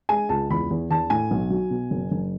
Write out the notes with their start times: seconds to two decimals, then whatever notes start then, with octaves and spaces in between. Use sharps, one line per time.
0.09 G#3 G#5
0.29 C#2 A5
0.50 E2 B5
0.70 E2
0.91 E2 A5
1.10 A2 G#5
1.31 B1
1.50 F#3
1.70 B2
1.91 F#1
2.11 F#1